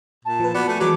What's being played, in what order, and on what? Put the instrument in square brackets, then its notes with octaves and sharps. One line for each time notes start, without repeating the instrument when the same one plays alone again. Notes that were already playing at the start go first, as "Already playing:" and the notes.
[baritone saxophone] A#2 [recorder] A5
[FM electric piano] F3 B4
[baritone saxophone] B3 [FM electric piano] F#4 D5 C#7
[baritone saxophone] A3 [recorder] G#5
[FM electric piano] E3 G#3 F#4 [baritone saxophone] F#3 [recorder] D6